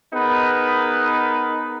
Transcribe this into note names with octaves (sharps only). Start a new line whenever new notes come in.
B3 D#4 G#4 A#4 B4